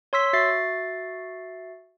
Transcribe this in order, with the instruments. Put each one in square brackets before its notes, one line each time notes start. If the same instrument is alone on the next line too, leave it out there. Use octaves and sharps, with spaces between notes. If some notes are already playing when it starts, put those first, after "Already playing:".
[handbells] C#5 C6 E6 B6
F#4 E5 A6 C7